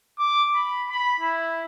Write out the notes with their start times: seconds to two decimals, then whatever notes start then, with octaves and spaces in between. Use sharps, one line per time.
0.19 D6
0.55 B5
0.90 B5
1.20 E4